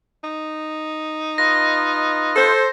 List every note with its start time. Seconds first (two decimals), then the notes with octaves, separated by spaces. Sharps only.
0.24 D#4
1.38 F4 B4 D#5 A#6
2.36 A4 C5